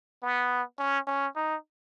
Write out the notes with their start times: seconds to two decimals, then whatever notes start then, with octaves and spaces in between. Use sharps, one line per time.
0.23 B3
0.79 C#4
1.07 C#4
1.36 D#4